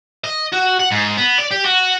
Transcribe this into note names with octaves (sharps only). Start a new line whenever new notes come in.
D#5
F#4
F#5
G#2
B3
D5
G4
F#4